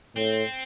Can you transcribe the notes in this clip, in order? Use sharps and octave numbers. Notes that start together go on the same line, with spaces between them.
A2 C4